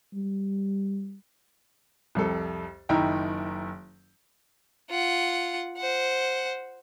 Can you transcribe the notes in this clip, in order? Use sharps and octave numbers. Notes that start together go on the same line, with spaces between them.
G3
C2 F2 A4
F#1 D#3 D#4 E4 G5 A#5
F4 F#5
C5 F#5